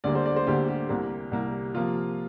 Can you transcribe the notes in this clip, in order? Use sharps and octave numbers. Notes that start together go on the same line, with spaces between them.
D2 D3 G3 A#3 D5
C5
D5
C5
D2 D3 G3 A#3 G4
G4
C2 C3 G3 A#3
C2 C3 G3 A#3
C3 F3 A#3 F4